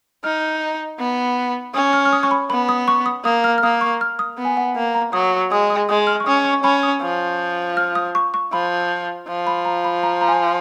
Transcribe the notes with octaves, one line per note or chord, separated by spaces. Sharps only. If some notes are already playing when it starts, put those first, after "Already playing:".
D#4 F6
B3
C#4 D#6
F6
F6
D#6
C#6
B5
B3 B5
D#6
C#6
D#6
A#3 D#6
F6
F6
A#3 D#6
C#6
F6
D#6
B3
G#5
F#5
A#3
A#5
F#3 D#6
G#3 D#6
D#6
G#3 D#6
F6
C#6
C#4 D#6
C#6
C#4 B5
D#6
F3
F6
D#6
C#6
C#6
F3 B5
F3
B5
A#5
B5
A#5
A#5
G#5